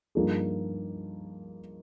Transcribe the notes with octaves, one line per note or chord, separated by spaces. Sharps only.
G2 F3 A#3 D#4 G#4